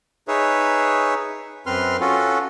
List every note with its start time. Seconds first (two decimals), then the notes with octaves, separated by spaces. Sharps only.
0.28 D#4 G#4 B4 C#5 E5
1.66 F#2 C4 B4 C6 F6
2.00 C#4 F4 F#4 A4